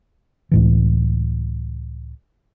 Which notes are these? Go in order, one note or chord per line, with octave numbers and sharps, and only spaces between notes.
C#2 A2 E3